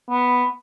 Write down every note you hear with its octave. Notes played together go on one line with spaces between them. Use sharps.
B3